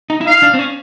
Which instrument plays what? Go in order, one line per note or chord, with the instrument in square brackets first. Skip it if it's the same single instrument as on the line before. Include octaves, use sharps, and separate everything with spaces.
[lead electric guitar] D#4
E4
[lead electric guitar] D#4 [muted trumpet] F5
[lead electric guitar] D4
C4
C#4